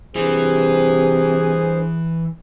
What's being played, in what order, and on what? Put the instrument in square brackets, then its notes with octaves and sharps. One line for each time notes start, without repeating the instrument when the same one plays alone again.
[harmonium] G2 C5 [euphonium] C3 [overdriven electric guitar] E3 E4 [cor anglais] G#4